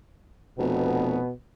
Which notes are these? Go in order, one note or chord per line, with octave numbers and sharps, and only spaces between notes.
F1 B2 B3